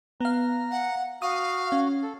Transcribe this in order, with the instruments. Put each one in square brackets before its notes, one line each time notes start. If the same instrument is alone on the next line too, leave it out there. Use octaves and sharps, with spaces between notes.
[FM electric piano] B3 F5 [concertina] A#5
[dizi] F#5
[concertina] F#4 [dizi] F5 [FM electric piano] D#6
[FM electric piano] C#4
[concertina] A4